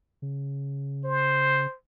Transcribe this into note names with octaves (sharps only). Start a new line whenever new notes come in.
C#3
C5